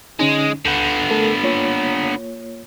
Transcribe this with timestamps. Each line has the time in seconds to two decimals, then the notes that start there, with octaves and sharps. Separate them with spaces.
0.19 D3 G#3 C#4 D#4
0.65 C#2 D3 B3 G6
1.11 A3 A4 A#4
1.43 A#3 F4 C#5